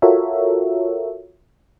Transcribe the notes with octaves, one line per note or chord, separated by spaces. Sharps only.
F4 F#4 A4 A#4 C#5 E5